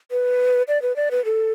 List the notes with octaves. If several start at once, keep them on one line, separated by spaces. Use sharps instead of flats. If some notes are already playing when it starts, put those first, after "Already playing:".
B4
D5
B4
D5
B4
A4